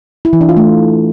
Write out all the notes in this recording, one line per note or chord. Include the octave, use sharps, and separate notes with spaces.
E4
E3
D4
F4
A3